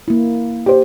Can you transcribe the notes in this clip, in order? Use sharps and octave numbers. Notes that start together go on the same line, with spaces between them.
A#3 E4
G4 C5